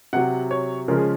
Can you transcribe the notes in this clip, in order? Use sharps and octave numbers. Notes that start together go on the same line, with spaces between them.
C3 F#3 F#5
C#5
C#3 F3 G#3 A#4
G#4